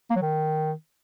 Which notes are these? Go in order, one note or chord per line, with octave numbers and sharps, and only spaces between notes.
A#3
F#3
D#3